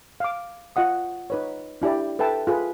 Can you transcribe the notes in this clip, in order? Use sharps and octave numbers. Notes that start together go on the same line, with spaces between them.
F5 D6
F4 D#5 F#5 D#6
D#4 B4 C#5
D4 E4 G4 D5
A4 B4 E5 G5 A5
F4 G#4 B4